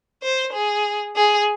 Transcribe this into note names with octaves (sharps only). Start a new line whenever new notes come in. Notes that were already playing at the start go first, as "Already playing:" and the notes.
C5
G#4
G#4